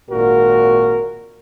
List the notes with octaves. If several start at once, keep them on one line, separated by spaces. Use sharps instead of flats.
G#1 A#2 F#4 A#4